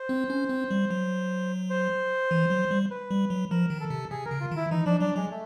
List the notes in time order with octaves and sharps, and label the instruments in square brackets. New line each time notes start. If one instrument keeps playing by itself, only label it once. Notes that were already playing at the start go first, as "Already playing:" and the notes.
Already playing: [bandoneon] C5
[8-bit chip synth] C4
C#4
C4
G3
F#3
[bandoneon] C5
[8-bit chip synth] E3
F#3
G3
[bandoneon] B4
[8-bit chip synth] G3
F#3
[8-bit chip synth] F3 [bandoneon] A#4
[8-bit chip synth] D#3
[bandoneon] A4
[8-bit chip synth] C3
[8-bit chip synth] C3 [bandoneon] G#4
[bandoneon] A#4
[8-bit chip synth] C#3
[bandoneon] F4
[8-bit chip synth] D#3 [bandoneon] E4
[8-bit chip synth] E3 [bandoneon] D#4
[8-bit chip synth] F3 [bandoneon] D4
[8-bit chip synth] F#3 [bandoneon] D4
[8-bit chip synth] F#3 [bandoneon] G#3
[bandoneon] A3